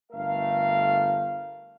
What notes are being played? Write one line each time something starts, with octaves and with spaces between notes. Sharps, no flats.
G1 A3 A#4 F5